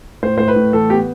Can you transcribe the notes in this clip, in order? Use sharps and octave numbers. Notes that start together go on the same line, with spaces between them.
A2 C5
A2 C5
B4
A2
E3 A4
B3 G4